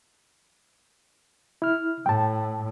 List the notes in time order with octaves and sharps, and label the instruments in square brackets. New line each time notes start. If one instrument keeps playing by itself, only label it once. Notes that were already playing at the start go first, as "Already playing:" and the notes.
[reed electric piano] E4 F6
[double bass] A2 [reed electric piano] G5 A5